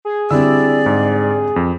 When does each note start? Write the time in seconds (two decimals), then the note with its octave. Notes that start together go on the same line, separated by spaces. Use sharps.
0.05 G#4
0.31 D3 G3 C4 E4 D5 E6
0.86 G#2
1.56 F2